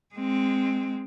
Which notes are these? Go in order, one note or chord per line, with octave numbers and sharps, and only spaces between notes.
G#3 C4